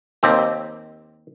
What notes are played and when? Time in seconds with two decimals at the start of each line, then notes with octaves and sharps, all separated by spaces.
0.23 D#2 C4 G4